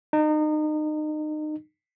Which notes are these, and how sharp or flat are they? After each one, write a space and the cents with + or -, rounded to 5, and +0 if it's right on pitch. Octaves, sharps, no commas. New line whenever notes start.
D#4 -30